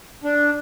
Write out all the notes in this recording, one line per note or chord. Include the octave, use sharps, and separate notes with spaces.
D4